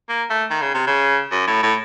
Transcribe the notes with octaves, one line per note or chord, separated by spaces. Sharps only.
A#3
A3
D#3
C#3
C3
C#3
F#2
A2
A2